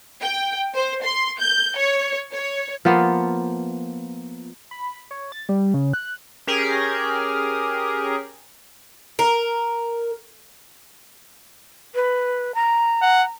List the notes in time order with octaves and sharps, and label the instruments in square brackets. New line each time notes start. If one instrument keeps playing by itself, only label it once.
[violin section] G5
C5
C6
G6
C#5
C#5
[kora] F3 A#3 B3 F4
[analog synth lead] B5
C#5
A6
G3
C#3
F#6
[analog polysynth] C#4 G4 G#4 A#4
[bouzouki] A#4
[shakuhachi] B4
A#5
[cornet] F#5